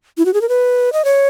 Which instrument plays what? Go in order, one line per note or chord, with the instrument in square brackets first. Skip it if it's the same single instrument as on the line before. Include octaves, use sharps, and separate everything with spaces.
[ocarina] E4
F#4
G#4
A#4
B4
D#5
C#5